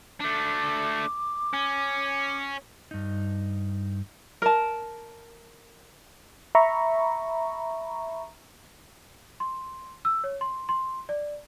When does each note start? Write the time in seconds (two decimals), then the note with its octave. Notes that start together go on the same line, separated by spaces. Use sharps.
0.20 A3 D4 D6
1.54 C#4
2.91 G2 D#4
4.42 A#4 A5
6.55 E5 A#5 B5 C#6
9.40 C6
10.05 E6
10.24 C#5
10.41 C6
10.69 C6
11.09 D5